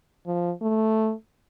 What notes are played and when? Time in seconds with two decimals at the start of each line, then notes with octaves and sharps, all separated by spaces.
0.27 F3
0.62 A3